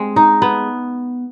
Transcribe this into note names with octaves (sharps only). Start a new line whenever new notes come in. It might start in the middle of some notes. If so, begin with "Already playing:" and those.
Already playing: G#3 C4
D#4
B3